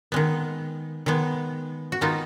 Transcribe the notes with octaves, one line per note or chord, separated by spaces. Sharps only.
D#3 G#3 B3
D#3 G#3 B3
F#4
D#3 G#3 B3 D#4 F4